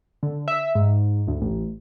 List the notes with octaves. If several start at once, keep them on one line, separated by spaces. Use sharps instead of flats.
D3
E5
G#2
D2
A1